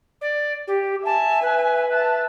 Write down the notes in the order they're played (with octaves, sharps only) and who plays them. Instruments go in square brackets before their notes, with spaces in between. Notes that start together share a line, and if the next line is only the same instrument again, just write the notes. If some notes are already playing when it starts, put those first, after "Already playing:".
[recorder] D5
G4
[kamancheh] E5 G#5 [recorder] A5
[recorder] B4
[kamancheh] E5 A5